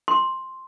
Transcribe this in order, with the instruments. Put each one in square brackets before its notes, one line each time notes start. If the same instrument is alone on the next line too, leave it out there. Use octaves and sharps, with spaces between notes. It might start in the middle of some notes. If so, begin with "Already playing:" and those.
[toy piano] C6